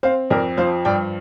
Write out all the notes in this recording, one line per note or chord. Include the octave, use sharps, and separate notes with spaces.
C4 C5 F5
F2 A#4 D5
F3 C5 F5
G2 D5 G5